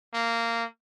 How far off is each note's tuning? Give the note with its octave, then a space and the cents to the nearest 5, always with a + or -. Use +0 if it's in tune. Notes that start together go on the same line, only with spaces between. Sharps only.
A#3 -15